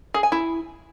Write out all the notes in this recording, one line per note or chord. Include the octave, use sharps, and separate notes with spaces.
G#4
G#5
E4